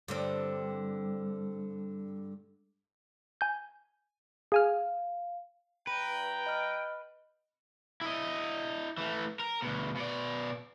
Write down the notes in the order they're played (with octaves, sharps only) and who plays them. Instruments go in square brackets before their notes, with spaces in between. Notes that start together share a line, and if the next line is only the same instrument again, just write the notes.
[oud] G2 D3 C4
[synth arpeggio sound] G#5 G6
[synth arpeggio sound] G#4 G#5 F6 [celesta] F5
[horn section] G2 A#5 [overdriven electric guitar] B4 [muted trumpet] G5
[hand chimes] D#5 F6
[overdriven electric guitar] E4 D#5
E3 A3
A#4
D2 B2
B2 D5